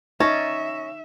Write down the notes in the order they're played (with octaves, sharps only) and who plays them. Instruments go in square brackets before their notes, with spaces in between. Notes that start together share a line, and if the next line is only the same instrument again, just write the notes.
[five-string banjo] C#4 A5 [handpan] D#4 D#5 [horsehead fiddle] E5 [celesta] C#6 A#6